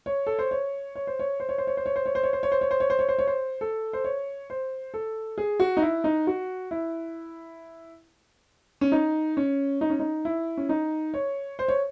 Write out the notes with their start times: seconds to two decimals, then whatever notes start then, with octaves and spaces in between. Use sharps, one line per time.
0.06 C#5
0.27 A4
0.39 C5
0.51 C#5
0.96 C#5
1.07 C5
1.19 C#5
1.40 C5
1.49 C#5
1.58 C5
1.67 C#5
1.77 C5
1.86 C#5
1.96 C5
2.06 C#5
2.15 C5
2.23 C#5
2.33 C5
2.43 C#5
2.52 C5
2.61 C#5
2.71 C5
2.80 C#5
2.90 C5
2.99 C#5
3.09 C5
3.19 C#5
3.27 C5
3.61 A4
3.93 C5
4.04 C#5
4.50 C5
4.94 A4
5.38 G#4
5.60 F#4
5.77 D#4
5.82 E4
6.04 D#4
6.27 F#4
6.71 E4
8.81 C#4
8.92 D#4
9.37 C#4
9.81 D#4
9.90 C#4
9.99 D#4
10.25 E4
10.57 C#4
10.69 D#4
11.14 C#5
11.59 C5
11.68 C#5